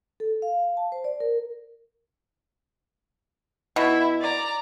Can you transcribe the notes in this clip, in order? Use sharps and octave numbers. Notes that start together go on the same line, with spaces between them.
A4
F5
A5
C5
D5
A#4
B2 E4
D5 A#5